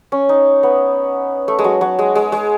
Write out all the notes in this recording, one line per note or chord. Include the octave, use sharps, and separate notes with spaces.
C#4
D#4
B3
A3
G#3
F#3
F#3
G#3
G#3
G#3